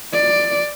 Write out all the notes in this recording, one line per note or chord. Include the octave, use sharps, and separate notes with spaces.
D5